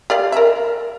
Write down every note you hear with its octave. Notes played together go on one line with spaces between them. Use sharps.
G4 D5 F5
A#4 E5